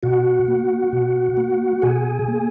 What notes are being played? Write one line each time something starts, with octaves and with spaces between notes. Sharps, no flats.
B2 F#4 F#5
A#3
B2
A#3
B2 G#4 G#5
A#3